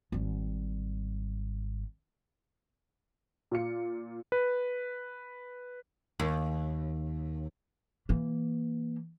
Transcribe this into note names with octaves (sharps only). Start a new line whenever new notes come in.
G#1 G3
A#2 F4 C#7
B4
D#2
E3 A#3